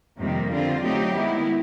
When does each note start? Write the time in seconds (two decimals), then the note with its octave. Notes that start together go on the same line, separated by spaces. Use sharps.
0.19 F2 C3 D#3 G3 A#3
0.50 D3 G3 C4 F4
0.83 F#3 A3 C4 D#4 G4
1.15 D#3 G#3 B3 E4